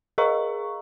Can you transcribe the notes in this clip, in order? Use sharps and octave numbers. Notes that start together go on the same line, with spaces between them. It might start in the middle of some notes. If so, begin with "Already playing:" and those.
G#4 A#4 D#5 F5 A#5 C#6